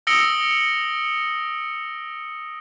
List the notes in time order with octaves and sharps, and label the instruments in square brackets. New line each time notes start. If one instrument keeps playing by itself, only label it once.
[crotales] D#6 E6 A#6 C#7 D7 G7